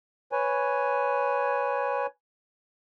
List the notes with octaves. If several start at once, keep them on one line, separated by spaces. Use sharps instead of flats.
B4 C#5 G#5